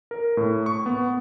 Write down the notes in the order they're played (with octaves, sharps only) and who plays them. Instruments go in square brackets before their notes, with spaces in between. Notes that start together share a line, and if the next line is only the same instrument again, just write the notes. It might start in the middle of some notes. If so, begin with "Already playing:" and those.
[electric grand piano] A#4
A2
C#6
B3